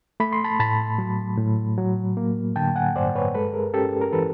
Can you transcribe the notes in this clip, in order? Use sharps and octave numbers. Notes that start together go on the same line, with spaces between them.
A3 B5
C6
A5 B5
A2 A5 B5
F#3
A2
F#3
A#3
D3 G5 A5
F#5 G#5
G2 C5 D5
B4 C#5
G#3 A4 B4
G#4 A#4
C#4 G4 A4
A#4
E3 A4 B4